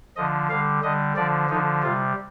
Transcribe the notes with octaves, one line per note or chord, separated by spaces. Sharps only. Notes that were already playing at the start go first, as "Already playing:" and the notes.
D3 F3 D#5
D3 G3 F5
D3 G3 D#5
D3 F3 D5
D3 F3 D#4
C3 G3 F4